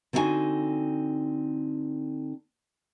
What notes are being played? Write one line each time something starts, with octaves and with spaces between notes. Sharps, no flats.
D3 C4 D#4 E4 F#4 G#5